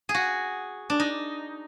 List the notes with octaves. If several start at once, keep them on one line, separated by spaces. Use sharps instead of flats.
G#4
F#4
D4
D#4